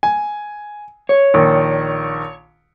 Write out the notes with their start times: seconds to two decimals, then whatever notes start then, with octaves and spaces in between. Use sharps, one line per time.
0.03 G#5
1.09 C#5
1.34 A#1 D#3